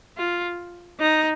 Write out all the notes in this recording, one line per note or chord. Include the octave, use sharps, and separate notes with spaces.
F4
D#4